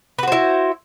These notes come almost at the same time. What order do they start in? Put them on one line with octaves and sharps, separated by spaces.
B4 F#4 C5 E4